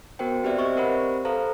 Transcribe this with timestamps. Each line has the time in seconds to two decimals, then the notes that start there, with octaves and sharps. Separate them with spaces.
0.19 B3 F#4 A#4 C5 G5
0.44 C4 G4 B4 C5 D5 E5
0.58 C5 D#5 E5 C#6
0.75 C4 G4 A#4 C5 F#5 B5
1.25 A4 B4 C5 F5 A#5